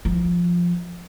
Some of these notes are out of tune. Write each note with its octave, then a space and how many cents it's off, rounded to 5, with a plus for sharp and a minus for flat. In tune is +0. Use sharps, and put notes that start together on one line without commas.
F3 +0 F4 +0